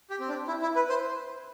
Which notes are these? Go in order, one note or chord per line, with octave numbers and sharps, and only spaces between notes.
G4
C4
D4
E4
E4
B4
C5